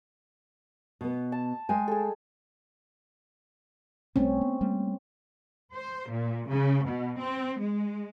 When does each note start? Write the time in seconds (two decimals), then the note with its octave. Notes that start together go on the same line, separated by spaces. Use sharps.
1.01 B2 B3
1.32 A5
1.69 G#3 G5 G#5
1.88 G#4 A4
4.16 B1 G3 A3 C4 C#4
4.41 A3 B3
4.61 G3 A3 A#3
5.73 C5
6.09 A#2
6.49 C#3
6.85 B2
7.18 C4
7.60 G#3